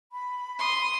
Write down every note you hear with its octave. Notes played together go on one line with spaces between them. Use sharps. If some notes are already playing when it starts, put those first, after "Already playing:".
B5
C6 D#6